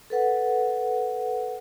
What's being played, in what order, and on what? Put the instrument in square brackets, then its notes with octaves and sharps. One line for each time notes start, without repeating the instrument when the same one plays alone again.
[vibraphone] A4 B4 F#5